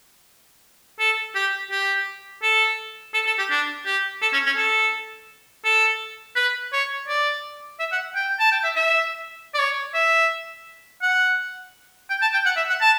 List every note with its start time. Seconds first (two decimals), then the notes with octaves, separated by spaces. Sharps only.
0.99 A4
1.35 G4
1.71 G4
2.43 A4
3.14 A4
3.26 A4
3.39 G4
3.50 D4
3.86 G4
4.22 A4
4.33 C#4
4.46 C#4
4.57 A4
5.65 A4
6.36 B4
6.73 C#5
7.08 D5
7.79 E5
7.92 F#5
8.15 G5
8.39 A5
8.52 G5
8.64 E5
8.75 E5
9.54 D5
9.59 C#5
9.94 E5
11.02 F#5
12.10 G5
12.21 A5
12.33 G5
12.45 F#5
12.56 E5
12.69 F#5
12.80 A5